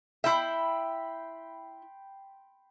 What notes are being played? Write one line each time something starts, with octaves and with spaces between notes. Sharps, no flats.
E4 E5 G5 B5 C6